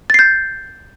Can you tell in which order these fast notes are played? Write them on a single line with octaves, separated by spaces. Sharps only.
A6 C7 G6